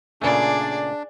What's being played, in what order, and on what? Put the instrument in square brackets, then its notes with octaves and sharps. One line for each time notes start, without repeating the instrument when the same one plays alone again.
[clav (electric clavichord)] A#2 C#3 A3 [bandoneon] D4 [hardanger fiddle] G#4 D5